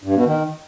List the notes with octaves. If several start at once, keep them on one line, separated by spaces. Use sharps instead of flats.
G2
B2
D#3